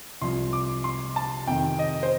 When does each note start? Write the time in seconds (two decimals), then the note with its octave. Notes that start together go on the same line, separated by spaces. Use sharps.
0.21 C2 C3 F3 C6
0.53 D6
0.84 C6
1.16 A5
1.47 F2 C3 D#3 G5
1.79 D#5
2.03 C5